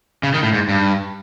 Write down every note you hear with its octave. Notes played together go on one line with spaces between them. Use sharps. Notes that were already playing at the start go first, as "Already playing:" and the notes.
C#3
D#3
A2
G#2
G2